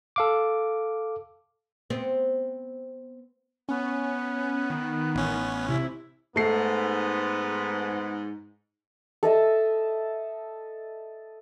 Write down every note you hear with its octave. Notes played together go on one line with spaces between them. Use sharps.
A4 F5 D6
B3 C4
B3 C#4
D#3
A1 C#4
C3 E4
G#2 A3 B3 C7
A4 D#5 E5 A5